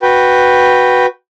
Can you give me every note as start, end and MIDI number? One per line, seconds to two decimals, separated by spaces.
0.02 1.06 66
0.02 1.06 71
0.02 1.06 79